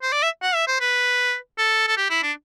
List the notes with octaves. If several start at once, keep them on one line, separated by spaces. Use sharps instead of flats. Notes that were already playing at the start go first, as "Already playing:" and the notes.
C5
D5
E5
F#5
E5
C5
B4
A4
A4
G4
E4
D4